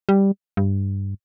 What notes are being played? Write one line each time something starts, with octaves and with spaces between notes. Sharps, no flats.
G3
G2